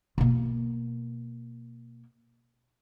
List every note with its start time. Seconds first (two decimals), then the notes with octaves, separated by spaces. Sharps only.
0.18 B2 A#3